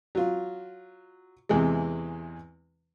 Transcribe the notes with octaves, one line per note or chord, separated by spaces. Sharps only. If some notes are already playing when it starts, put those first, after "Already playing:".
F#3 F4
E2 C3 E3 G#3